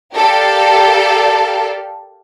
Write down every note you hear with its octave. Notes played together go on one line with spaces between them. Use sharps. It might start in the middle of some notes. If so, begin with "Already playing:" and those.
G4 A4 A#4 D5 F5